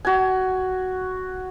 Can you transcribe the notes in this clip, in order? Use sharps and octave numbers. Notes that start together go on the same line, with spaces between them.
F#4 G#5